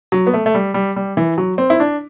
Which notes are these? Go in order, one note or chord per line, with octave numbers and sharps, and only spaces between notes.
F#3
B3
A3
A3
G3
G3
G3
E3
F#3
C4
E4
D4